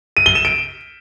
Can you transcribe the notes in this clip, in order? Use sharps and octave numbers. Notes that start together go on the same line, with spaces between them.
D#7
G7
E7
D7